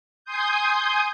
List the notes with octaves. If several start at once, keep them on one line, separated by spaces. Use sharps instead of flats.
G#5 C6 D#6 G6